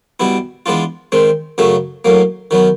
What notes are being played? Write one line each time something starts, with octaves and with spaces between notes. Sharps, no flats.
B2 G3 B3 E4
E3 G#3 B3 D4 F4
D#3 G#3 C4
F#2 C#3 F#3 A3
A2 F#3 A#3
D#3 F#3 B3